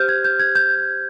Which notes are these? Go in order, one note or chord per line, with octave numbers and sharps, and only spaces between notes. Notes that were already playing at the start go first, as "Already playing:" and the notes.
Already playing: G4 C5 F6 G6
G#6
G6
G#6
G6